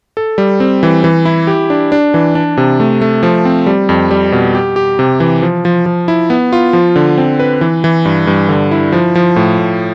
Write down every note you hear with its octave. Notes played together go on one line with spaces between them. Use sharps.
A4
G3
C4
E3
E3
E4
G4
D4
D4
E3
D4
C3
A3
A3
F3
C4
G3
F2
G3
B2
G4
G4
C3
E3
F3
F3
F3
E4
B3
F4
F3
D3
C4
B4
E3
E3
G2
G2
D3
E4
F3
F3
A2
A2